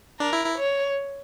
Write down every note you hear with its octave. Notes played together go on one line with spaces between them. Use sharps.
D4 A#4
E4
E4
C#5